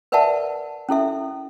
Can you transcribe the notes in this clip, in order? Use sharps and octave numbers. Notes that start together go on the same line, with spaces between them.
A#4 B4 D5 E5 F#5 A5
C#4 E4 A4 E5